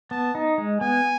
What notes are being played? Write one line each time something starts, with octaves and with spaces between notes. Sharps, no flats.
B3 A5
D#4
G#3
B3 G#5